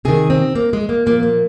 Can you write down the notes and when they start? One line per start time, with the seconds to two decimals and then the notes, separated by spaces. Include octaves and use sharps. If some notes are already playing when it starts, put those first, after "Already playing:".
0.05 C3 D#3 G#4
0.30 C4
0.55 A#3
0.73 G#3
0.89 A#3
1.06 A#2 F3 A#3
1.23 A#3